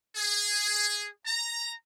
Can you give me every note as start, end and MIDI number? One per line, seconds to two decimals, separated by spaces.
0.16 1.07 68
1.26 1.72 82